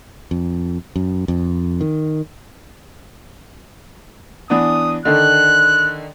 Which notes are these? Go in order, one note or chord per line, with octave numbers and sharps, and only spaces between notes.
F2
F#2
F2
D#3
E3 B3 D4 D#6
D3 D#3 D4 F#6